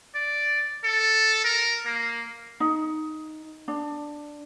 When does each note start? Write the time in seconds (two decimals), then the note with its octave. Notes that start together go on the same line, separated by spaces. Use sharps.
0.15 D5
0.84 A4
1.44 A#4
1.86 A#3
2.60 D#4
3.68 D4